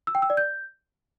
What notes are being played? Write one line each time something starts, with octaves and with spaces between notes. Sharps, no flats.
E6
G5
E6
D5
G6